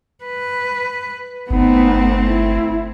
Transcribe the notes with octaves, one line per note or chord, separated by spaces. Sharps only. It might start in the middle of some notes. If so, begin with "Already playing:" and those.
B4
G1 A3 B3 C4 D#4
E4